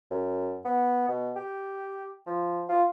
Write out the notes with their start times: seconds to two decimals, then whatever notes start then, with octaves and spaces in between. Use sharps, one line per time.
0.11 F#2
0.65 B3
1.08 B2
1.36 G4
2.27 F3
2.69 F4